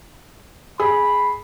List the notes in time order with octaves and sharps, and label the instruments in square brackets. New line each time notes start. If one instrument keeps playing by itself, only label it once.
[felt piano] G#4 [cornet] B5